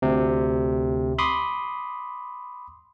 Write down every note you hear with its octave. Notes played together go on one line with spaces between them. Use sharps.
D2 C3
B5 C6 D6 D#6